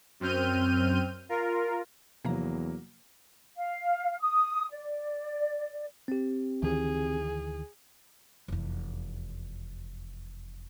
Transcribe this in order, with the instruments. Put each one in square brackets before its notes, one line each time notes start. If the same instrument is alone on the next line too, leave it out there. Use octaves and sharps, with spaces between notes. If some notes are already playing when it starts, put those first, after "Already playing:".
[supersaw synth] F#2 C4 F6 G6 D#7
F4 A#4
[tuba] E2 [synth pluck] C3 F3 A#5 [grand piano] F#3 A#3
[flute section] F5
D#6
D5
[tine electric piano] C4 G4
[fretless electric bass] D2 D#3 E3 [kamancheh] G#4
[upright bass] F1 E2